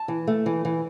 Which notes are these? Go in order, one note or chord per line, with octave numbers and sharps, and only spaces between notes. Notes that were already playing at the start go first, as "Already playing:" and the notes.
Already playing: A5
E3
A3
E3
E3